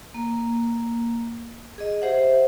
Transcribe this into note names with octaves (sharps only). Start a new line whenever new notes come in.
A#3
G#4 D#5
G4 C5 E5 F#5